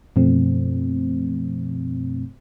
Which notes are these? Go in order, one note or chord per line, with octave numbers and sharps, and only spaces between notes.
F#2 B2 F3 A3 C4